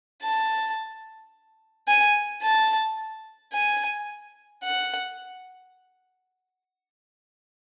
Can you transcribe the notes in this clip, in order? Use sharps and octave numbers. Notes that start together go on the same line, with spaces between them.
A5
G#5
A5
G#5
F#5